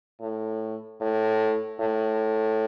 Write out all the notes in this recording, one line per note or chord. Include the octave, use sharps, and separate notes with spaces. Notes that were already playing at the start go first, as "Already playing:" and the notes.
A2
A2
A2